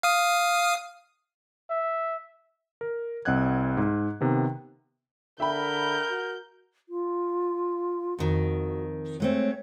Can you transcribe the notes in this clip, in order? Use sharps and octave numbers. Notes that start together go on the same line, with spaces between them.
F5 D#6
E5
A#4
C2 C4 D#5 F#5 F#6 G#6
G#2
C3 D#3 B3
D3 A#4 E5 G5 B5 G6
F#4
F4
F2 D#3 F#4
G#3 A3 C4 C#5